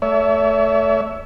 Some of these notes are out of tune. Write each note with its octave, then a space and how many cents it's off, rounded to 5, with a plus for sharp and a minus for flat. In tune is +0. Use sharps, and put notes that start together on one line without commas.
A3 +0 C#5 +40 E5 +0